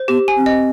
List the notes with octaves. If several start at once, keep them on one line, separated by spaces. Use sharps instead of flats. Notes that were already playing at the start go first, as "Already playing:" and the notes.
Already playing: C5
B3 G4
G#5
C4
D#5